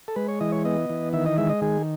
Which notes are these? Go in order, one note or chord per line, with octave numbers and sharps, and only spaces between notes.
A4
G#3 B4
C#5
E3 D#5
C#5
B3 D#5
E3
D#3 E5
D#5
G#3 E5
D#5
D#3 G#4